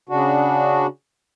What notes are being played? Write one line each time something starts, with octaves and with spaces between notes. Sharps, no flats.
C#3 D4 F#4